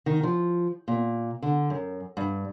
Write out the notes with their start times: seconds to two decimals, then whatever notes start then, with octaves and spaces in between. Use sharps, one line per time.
0.06 D#3
0.23 F3
0.88 A#2
1.42 D3
1.70 F#2
2.17 G2